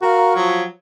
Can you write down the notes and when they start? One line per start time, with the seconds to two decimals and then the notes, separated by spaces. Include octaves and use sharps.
0.02 F#4 A#4 F5
0.35 F3 F#3